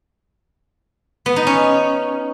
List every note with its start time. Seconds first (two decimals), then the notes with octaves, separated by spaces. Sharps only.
1.26 B3
1.36 D#4
1.47 C#4